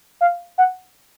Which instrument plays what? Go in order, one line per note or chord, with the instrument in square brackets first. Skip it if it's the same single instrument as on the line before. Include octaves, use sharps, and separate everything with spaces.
[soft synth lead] F5
F#5